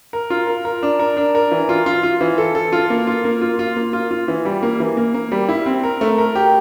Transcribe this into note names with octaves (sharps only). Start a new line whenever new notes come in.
A#4
F4
A#4
A#4
D4
A#4
D4
A#4
E3
F4
F4
F4
E3
A4
A4
F4
A#3
F4
A#3
F4
F4
A#3
F4
F4
E3
G3
A#3
E3
A#3
A#3
G3
E4
C4
A#4
A3
A#4
G4